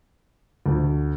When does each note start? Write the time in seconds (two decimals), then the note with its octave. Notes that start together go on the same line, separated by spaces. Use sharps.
0.66 D2